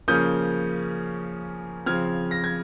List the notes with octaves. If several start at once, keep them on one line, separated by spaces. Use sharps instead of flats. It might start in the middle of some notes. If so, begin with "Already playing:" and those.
C#3 F3 A#3 C#4 D#6 G6
C#3 F3 C4 F6 G#6
A#6
G#6